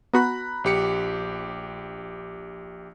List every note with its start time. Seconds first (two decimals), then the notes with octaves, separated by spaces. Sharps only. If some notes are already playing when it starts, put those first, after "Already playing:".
0.13 B3 F#4 A#5 B5 F#6
0.64 A#1 G4 C#7